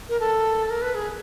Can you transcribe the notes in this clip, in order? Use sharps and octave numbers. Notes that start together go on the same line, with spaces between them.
A#4
A4
A#4
B4
G#4